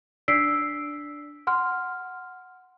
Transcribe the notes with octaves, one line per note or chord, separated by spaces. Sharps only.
D4 D5 E6 B6 C7 D7
F#5 C6 F6